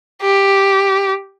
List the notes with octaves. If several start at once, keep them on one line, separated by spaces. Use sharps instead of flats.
G4